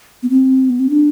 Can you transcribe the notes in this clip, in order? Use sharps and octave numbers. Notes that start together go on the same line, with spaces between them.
B3
C4
B3
C4
D4